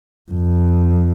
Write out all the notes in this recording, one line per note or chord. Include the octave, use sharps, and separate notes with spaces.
F2